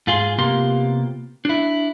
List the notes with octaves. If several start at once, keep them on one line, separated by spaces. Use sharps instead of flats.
G#2 F4 G#4 C6
C3 A#3 B3 F4 G4 C6
D4 E4